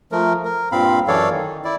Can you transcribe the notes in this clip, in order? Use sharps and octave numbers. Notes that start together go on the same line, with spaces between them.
F3 A3 A#4
A#4
G2 A#2 C4 F5 B5
F#2 E3 A4 C#5 D5 F5
D#3
E4 D5